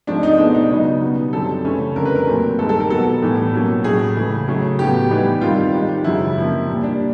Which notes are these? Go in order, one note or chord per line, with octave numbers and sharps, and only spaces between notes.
G#2 F3 A3 C4 D4
D#4
B2 G#3 B3 D4
D#4
C#3 F#3 B3 D#4
B2 G3 B3
F#2 D3 G3 C4 A4
C#3 E3 A3 C#4
F2 D3 G3 A#4
B4
A#4
A#2 F#3 A3 C4
G2 D#3 G#3 A4
A4
A#4
B2 F#3 B3 A4
A2 E3 G3 B3
B2 F#3 A#3 C#4
A2 F#3 A3 G#4
C#3 E3 A3
C#3 F#3 A3
A2 F#3 B3 G4
G#2 E3 G3 B3
G2 D#3 G3 C4 F4
G#2 D#3 G3
F#2 C#3 E3 G#3 E4
C3 F3 A#3
A#2 G3 A#3
D4